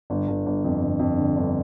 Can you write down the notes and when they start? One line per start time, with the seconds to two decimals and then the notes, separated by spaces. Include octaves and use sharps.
0.10 G1
0.28 G1
0.46 G1
0.64 F2
0.81 G1
0.99 F2
1.18 D3
1.36 G1